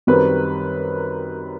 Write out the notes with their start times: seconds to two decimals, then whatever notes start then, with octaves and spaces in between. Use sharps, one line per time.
0.07 F#2 D#3 G3 C4 B4